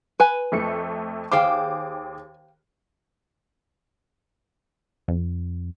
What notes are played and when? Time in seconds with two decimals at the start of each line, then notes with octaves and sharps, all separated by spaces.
0.20 B4 G#5
0.52 F2 A3 C#7
1.32 D#2 G#4 C5 F5 G5 D6
5.08 F2